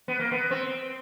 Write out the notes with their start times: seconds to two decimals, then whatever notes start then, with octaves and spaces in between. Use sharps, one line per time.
0.08 B3
0.20 A#3
0.31 B3
0.51 C4